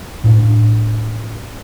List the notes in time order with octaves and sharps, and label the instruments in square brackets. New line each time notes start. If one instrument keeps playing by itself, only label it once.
[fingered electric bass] A2 D4